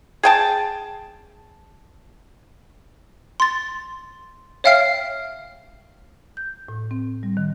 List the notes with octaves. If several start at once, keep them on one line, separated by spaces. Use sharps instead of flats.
G#4 G5 A5
C6 A6
C#5 E5 F5 G5 F6 C7
G6
A2
C4
G3
D#3